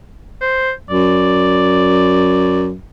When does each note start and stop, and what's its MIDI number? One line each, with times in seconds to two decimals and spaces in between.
0.41 0.72 72
0.90 2.77 42
0.90 2.66 74